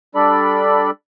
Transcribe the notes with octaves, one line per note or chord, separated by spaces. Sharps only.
G3 D4 A4 D5 B5